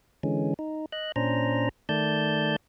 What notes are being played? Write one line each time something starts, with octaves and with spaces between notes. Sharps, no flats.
D3 E3 G#3 C#4
D#4
D#5 F#6
A#2 C#4 D4 C5 A#5
D#3 A3 D5 A5 G6